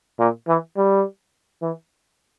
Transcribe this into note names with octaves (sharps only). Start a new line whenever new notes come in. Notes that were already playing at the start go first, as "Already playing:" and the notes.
A#2
E3
G3
E3